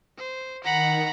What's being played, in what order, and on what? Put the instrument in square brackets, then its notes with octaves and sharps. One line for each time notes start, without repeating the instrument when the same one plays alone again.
[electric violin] C5
[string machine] D#3 [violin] F#5 [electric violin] A#5 B5